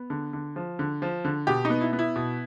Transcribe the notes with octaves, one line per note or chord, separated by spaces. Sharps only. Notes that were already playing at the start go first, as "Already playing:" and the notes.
Already playing: B3
D3
D3
F3
D3
F3
D3
B2 G4
D#4
B3
E4
B3
E4
B2